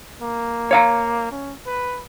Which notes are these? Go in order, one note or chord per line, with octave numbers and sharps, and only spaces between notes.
A#3
C#5 F5 A#5
C#4
B4